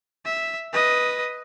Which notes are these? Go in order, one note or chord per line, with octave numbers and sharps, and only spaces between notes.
E5
B4 D#5